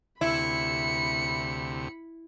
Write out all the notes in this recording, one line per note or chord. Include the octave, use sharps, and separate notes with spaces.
D2 C3 E4 B5 C#7